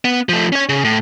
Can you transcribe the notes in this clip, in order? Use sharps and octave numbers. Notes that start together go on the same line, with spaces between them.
B3
F3 A3
C#4 C#5
C#3
A2